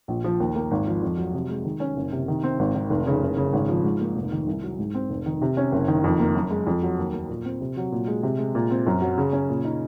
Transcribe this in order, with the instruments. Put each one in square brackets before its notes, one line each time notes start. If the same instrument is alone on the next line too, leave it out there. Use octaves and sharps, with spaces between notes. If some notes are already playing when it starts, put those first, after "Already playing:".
[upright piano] A#1
F3
D#2
A#3
G#1
F3
F2
F#3
C3
G#3
D#3
C#4
F#1
C3
D#3
C4
G#1
D#3
F1
C#3
F#1
C#3
G#1
F3
G#2
A#3
F1
D#3
C2
F#3
G#2
C4
F1
D#3
C3
C#4
F#1
D#3
F2
A#3
F#2
G#3
F2
F#3
D#2
A#3
A#2
C4
C3
F#3
A#2
G#3
C3
G#3
A#2
C4
F#2
F#3
C#3
C#4
A#2
D#4